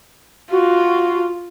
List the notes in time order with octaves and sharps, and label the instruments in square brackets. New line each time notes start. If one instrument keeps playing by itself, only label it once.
[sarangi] F4 [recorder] F#4